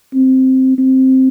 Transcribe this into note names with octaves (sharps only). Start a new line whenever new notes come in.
C4
C4